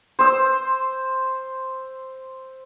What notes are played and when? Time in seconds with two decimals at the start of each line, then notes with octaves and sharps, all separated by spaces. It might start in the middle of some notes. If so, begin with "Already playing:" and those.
0.19 C5 E6